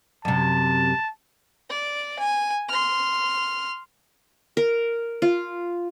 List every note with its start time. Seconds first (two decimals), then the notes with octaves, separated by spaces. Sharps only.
0.25 F#2 C3 A5
1.69 D5
2.19 G#5
2.69 C6 F6
4.57 A#4
5.22 F4